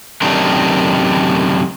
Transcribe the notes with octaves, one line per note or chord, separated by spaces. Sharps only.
F#2 C3 D#3 A3 D4